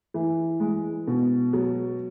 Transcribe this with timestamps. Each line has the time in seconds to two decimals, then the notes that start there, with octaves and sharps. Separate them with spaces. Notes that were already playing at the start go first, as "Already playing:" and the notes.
0.14 E3
0.60 G#3
1.07 B2
1.53 F#3